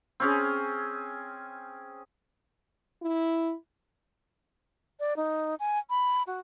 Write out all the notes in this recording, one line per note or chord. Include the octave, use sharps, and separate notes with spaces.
C4 C#4 G#4
E4
D5
D#4
G#5
B5
F#4